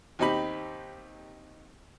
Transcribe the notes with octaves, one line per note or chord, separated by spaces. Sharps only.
D#2 C4 D#4 G4 B5